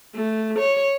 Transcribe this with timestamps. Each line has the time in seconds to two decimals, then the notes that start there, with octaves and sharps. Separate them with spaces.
0.15 A3
0.59 C#5